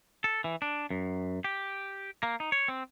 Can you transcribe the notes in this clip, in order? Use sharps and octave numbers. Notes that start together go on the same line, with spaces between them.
A4
E3
D4
F#2
G4
A#3
D#4
C#5
C4